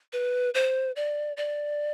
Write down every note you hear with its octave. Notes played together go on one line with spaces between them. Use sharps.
B4
C5
D5
D5